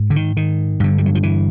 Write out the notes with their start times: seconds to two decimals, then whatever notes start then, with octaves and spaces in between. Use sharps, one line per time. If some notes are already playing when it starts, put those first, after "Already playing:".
Already playing: G#2
0.10 D3
0.16 D#3
0.37 D#3
0.80 G2 D3
0.98 G3
1.06 F#3
1.15 F3
1.23 E3